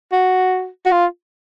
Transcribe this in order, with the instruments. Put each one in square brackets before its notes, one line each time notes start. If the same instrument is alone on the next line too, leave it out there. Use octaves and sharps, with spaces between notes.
[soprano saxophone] F#4
F#4
F4